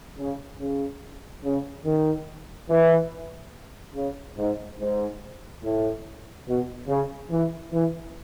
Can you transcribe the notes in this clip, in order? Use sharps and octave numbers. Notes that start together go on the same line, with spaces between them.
C#3
C#3
C#3
D#3
E3
C#3
G#2
G#2
A2
B2
C#3
E3
E3